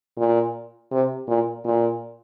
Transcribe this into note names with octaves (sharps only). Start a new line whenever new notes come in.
A#2
C3
A#2
A#2